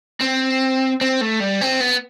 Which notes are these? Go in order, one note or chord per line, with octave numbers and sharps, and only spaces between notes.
C4
C4
A3
G3
C4
B3